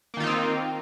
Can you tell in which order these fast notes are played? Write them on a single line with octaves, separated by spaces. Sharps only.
A#3 D#3 F4 D#4 C4